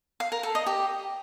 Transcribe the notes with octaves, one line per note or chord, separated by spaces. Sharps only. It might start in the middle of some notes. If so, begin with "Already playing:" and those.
F5
A#4
A4
D#5
G4